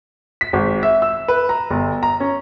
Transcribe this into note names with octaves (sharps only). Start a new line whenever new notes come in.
B6
G#1
E5
E6
B4
A#5
G1
A#5
C#4